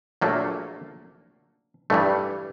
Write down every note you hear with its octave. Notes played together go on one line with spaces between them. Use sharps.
A#1 A#2 F#3 A3 A#3
G2 E3 G3 A3